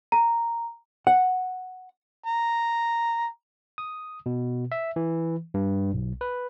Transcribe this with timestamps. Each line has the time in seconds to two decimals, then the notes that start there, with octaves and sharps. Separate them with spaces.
0.12 A#5
1.07 F#5
2.26 A#5
3.78 D#6
4.26 B2
4.72 E5
4.96 E3
5.54 G2
5.93 B1
6.21 B4